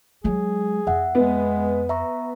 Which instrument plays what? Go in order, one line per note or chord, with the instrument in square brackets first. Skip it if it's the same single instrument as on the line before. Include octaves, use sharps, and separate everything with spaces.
[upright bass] F#3 G#3 [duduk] G#4
[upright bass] F2 [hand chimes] E5 F#5
[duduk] G#3 [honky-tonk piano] B3
[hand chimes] E5 A#5 C#6